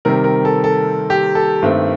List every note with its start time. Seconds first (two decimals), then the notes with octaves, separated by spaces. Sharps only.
0.05 C3 D#3 G3 C4 A#4
0.24 A#4
0.45 A4
0.64 A4
1.10 G4
1.35 A4
1.62 G2 D#3 A3 C4